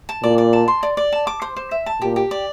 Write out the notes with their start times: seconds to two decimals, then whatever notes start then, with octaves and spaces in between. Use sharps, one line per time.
0.09 A5
0.23 A#2 D5
0.38 D5
0.53 A5
0.68 C6
0.83 D5
0.97 D5
1.12 A5
1.27 D6
1.42 C5
1.56 C5
1.71 E5
1.86 A5
2.02 A#2 G4
2.16 G4
2.31 D5